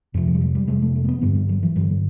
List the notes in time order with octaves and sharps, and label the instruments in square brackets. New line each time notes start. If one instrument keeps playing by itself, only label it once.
[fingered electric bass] F2 C3 F3
F3
G3
F#3
G3
F2 C3 G#3
A3
A3
A#3
B3
G2 D3 B3
G3
F#3
E3
G2 D3 F#3